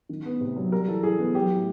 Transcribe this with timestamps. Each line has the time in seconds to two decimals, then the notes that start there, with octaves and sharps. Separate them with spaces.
0.09 D#3
0.25 B3
0.41 C3
0.56 F#3
0.72 G3 A#4
0.88 E3 A4
1.03 E3 G#4
1.19 B3
1.34 F#3 G4
1.50 A2